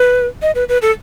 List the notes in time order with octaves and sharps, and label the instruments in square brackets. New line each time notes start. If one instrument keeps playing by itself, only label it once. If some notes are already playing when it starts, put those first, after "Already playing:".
Already playing: [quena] B4
D#5
B4
B4
A4